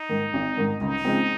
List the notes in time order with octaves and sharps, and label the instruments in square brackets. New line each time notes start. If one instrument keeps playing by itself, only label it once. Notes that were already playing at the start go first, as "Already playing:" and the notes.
Already playing: [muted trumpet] D#4
[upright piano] G#2 D#3
G#1
G#2 D#3
[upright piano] C#2 [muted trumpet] D#4
[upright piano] C#3 F3 G#3 C4